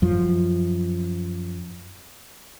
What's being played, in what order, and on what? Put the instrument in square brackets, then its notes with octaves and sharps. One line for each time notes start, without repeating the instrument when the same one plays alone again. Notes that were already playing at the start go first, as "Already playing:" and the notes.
[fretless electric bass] F#2 F3